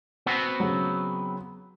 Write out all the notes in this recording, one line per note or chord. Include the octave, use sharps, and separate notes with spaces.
B3 C4 F#4
C#3 F#3